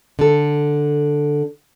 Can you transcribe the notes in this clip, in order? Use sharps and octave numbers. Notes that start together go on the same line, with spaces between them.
D3 A4